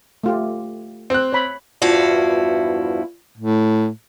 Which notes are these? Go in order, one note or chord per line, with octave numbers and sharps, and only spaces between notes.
A3 F4 G4
C4 F#6
C#5 B5
E2 G2 F3 E4 F#4 F5
A2